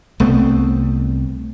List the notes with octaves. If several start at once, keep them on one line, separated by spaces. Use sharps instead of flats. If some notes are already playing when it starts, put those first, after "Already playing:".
C2 A3 B3 C4